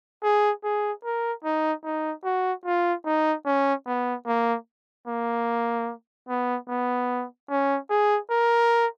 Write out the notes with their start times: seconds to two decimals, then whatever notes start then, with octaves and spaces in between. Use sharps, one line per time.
0.23 G#4
0.64 G#4
1.04 A#4
1.44 D#4
1.84 D#4
2.24 F#4
2.65 F4
3.06 D#4
3.46 C#4
3.86 B3
4.27 A#3
5.07 A#3
6.29 B3
6.68 B3
7.50 C#4
7.90 G#4
8.30 A#4